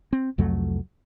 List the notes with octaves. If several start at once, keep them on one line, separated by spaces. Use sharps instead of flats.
C4
C2 F2 F#3 A3